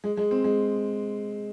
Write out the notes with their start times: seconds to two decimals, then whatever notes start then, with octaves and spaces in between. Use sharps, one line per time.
0.04 G#3
0.17 G#3
0.31 C4
0.44 G#3